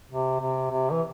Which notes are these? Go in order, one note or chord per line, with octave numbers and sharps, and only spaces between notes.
C3
C3
C3
E3